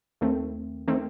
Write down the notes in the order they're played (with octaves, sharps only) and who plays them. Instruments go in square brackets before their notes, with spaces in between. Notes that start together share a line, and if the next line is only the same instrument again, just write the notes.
[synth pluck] D#2 D#3 A3 C4
D#3 A3 C4